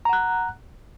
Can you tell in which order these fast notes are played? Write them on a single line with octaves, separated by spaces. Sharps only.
A#5 F#5 F#6